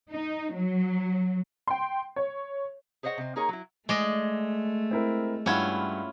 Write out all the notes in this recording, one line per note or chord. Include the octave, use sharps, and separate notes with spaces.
D#4
F#3
G5 C6
C#5
G#4 C5 C#5 D#5 F#5
C3 C4
A#3 D#4 G#4 A#4 C#5
F#3 E4
G#3 A3 D5 D#5
C4 E4 A#4
G2 C#4 E4 F4 F#5 G#6